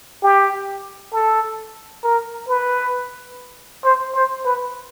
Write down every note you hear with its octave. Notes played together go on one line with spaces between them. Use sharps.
G4
A4
A#4
B4
C5
C5
B4